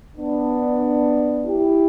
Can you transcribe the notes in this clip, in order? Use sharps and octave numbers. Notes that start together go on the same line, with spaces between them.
B3 D4
E4 G4